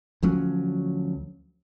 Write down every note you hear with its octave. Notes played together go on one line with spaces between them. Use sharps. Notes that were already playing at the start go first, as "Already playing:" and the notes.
D2 F3 F#3 C#4